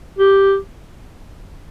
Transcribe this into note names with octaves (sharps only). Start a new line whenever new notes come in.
G4